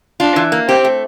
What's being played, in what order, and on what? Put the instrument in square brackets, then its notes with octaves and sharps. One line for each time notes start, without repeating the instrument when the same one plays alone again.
[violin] D4 [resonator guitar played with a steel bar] F4
[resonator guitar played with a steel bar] E3
A#3
[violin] C4 [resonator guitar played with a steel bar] G4
[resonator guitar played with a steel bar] A3